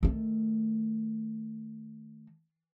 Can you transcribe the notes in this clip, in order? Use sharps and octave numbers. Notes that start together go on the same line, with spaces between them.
D#3 A3